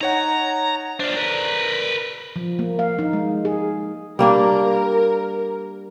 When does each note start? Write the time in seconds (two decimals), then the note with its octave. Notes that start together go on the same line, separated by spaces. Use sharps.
0.01 D#4 C#5 F#5 A#5
1.00 D4 F4 C5 D5
1.16 A#4 B4
2.36 F3
2.59 A#3
2.79 F5
2.99 D#4
3.13 G#3
3.45 G#4
4.19 G3 A#3 D4 A#4